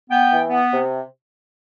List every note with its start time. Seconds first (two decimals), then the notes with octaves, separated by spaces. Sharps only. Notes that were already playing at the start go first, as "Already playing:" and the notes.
0.10 B3 G5
0.30 E3
0.50 B3
0.72 C3